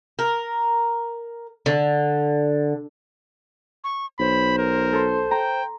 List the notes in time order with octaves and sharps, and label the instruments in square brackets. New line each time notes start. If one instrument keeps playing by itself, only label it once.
[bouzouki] A#4
D3
[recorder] C#6
[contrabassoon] B1 [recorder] C5 [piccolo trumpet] B5
[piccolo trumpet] A#4
[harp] A4 C6
[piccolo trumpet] G5 [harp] A#5